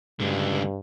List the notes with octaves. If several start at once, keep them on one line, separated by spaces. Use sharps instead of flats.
C#2 G2 D3